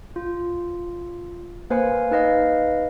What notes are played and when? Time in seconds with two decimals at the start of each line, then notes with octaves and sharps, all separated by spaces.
0.16 F4
1.70 A#3 B4 C5 F5 G#5
2.11 D#4 B4 D#5 F5